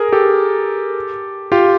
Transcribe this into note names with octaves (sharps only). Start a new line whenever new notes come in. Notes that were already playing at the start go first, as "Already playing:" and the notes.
Already playing: G#4 A#4
G4 A4
F4 G4